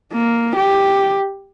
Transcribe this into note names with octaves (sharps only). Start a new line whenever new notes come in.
A#3
G4